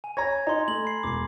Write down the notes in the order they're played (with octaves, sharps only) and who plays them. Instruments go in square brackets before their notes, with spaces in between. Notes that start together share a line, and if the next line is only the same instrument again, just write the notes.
[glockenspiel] G#5
[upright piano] C#5 A#5 [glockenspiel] G#6 A#6
[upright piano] D#4 [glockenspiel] A#5 C6
[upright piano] A3 [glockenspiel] F#7
[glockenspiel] B5 C7
[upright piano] E1 [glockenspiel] D6 C7